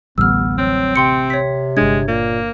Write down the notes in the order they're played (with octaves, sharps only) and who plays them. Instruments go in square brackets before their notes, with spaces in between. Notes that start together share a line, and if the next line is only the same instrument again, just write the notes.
[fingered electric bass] A1 D2 G3 [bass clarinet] B3 [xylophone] E6 F6
[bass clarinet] F#3 [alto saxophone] C4
[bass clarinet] C3 [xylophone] G5 C6 C#7
[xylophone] C#5 B6
[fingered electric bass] G1 D4 [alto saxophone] G#3 [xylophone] G#6
[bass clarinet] A#2 [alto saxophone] A#3